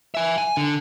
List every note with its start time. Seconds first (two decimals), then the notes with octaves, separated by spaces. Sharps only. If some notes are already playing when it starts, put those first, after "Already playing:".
0.15 E5 G#5
0.38 G#5
0.57 D3